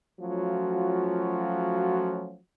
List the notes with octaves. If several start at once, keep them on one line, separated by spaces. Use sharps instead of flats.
F3 F#3 A3 C#4 F4 F#4